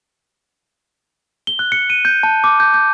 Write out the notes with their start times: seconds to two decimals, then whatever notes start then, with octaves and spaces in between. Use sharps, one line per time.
1.47 G7
1.59 F#6
1.72 C#7
1.90 D#7
2.05 G6
2.23 A5
2.44 D6
2.60 G6
2.74 G6